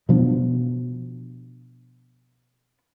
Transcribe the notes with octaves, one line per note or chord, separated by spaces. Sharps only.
B2 F3 B3 D4